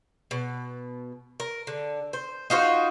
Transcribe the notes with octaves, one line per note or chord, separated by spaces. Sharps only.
B2
A#4
D3
C5
D#4 F4 F#4 C5